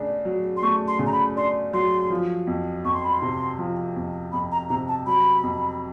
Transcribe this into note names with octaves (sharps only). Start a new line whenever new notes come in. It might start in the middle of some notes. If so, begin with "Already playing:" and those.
Already playing: C#3 A3 D4
F#3
C6
A3 C#6
C6
C#3
A#5
B5
D4 C6
F#3 C6
F3
F2
F2 C#6
C6
B5
C6
C3
F3
F2
F2 B5
A#5
C3 A#5
A5
F#3 B5
F2